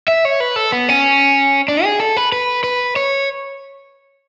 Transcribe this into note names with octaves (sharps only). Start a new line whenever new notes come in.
E5
C#5
B4
A4
B3
C#4
D4
G#4
A4
B4
B4
B4
C#5